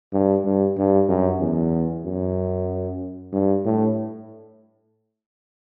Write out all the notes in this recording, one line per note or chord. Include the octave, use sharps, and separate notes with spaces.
G2
G2
G2
F#2
E2
F#2
G2
A2